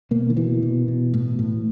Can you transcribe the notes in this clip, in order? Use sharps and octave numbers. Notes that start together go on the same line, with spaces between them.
B2 A#3
D#3
B2 E3
B2
B2
A2
A2